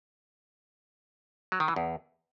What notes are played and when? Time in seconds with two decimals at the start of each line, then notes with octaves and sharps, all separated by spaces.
1.52 F#3
1.60 D#3
1.68 E3
1.76 E2